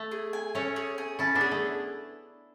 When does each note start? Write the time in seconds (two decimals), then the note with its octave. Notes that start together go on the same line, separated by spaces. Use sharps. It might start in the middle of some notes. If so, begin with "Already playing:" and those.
Already playing: A3
0.12 G#4
0.33 G#5
0.55 A3 C#4 C#5
0.76 G#4
0.98 G#4
1.19 C#4 E4 A5
1.35 B3 D4
1.41 G#4
1.51 A3